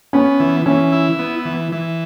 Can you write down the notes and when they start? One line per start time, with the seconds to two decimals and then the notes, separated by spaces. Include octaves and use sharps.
0.13 B3 C#4
0.40 E3
0.66 E3 C#4
0.92 E4
1.19 B3
1.45 E3
1.72 E3